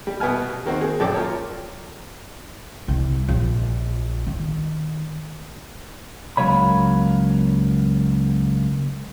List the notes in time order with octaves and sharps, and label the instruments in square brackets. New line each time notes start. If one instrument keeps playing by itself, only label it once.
[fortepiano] G3
B2 B3 F#4 G#5 F6
D#3 A#3 C4 F#4
G#4
F#2 A#2 A4 G5 A5 D6
F4 A#4 C#5
[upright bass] C2
A#1
D#3
[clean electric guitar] C#2 F#3 A#3 C#5 B5